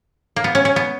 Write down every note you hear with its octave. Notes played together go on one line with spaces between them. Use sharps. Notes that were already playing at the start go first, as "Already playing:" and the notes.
A#3
B3
C#4
C#4
B3